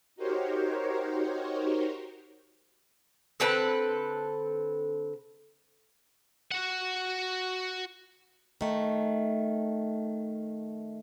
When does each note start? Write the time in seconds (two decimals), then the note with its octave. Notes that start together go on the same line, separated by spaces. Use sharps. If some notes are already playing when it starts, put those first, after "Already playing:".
0.16 D#4 F#4 G4 A#4 C5 C#5
3.40 D3 C4 A4 B4
6.51 F#4 F#5
8.61 D#3 A3